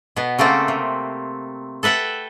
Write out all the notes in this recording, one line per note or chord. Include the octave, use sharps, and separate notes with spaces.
B2 B3
C#3 A3 A#3 C4
C3
A4 B4 E5 F#5 G5